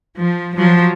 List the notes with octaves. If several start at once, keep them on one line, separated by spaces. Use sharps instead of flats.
F3
F3 F#3